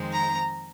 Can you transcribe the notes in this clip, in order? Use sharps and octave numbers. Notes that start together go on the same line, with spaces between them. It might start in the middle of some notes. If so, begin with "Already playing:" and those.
Already playing: F2 D#3 G#3 C4 D#4
A#5